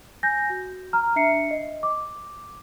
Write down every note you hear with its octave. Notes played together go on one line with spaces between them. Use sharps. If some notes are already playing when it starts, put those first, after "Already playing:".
G#5 G6 A#6
F#4
A#5 F6
D4 E5 C7 C#7
D#5
D6